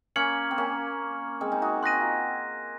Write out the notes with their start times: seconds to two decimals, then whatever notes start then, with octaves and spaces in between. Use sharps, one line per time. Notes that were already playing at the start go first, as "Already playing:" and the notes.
0.16 A#3 C#4 F6 G#6 C#7 F#7
0.51 C4
0.58 A#3 C#4
1.41 G#3 C4
1.52 C4 D#4
1.62 D#4 F#4
1.82 G#4 C6 F#6 A#6 D#7
1.92 F#4
2.01 F4